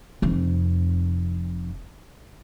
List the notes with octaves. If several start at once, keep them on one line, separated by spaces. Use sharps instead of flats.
F1 F2